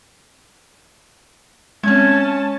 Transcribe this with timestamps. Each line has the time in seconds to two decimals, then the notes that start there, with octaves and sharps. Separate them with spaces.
1.83 G#3 C4 C#4 A5 G#6